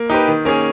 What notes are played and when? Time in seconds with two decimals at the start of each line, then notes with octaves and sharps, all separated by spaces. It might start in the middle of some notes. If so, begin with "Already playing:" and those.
Already playing: A#3
0.10 D#4 G4 B4
0.28 D#3
0.45 A#3 C#4 G#4